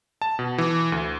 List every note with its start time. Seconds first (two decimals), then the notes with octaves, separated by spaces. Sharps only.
0.22 A5
0.39 B2
0.58 E3
0.92 D2